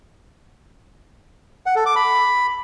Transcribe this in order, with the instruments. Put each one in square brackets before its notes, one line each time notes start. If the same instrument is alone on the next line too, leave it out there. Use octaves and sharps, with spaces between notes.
[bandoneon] F#5
A4
D6
B5